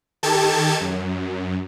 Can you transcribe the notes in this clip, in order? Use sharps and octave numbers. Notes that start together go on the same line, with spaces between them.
D#3 G4 A4 A5 G#6
F#2